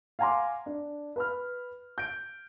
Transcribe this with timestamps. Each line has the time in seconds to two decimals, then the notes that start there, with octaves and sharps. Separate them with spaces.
0.19 F5 F#5 G#5 A#5 C6 D6
0.66 D4
1.16 B4 B5 F6
1.98 G6 D7